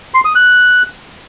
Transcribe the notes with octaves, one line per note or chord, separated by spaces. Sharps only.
C6
D#6
F#6